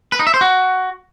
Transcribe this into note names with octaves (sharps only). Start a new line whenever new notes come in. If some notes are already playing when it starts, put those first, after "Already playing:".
B4
D#4
E5
C5
F#4